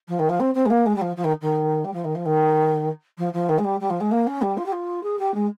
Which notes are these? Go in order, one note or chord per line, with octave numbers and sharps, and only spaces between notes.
F3
D#3
F3
C4
C4
G#3
A#3
G#3
G3
F3
F3
D#3
D#3
G3
F3
D#3
F3
D#3
F3
F3
D#3
G#3
G3
G3
F3
G#3
A#3
C#4
G3
F4
G4
F4
G#4
G4
G#3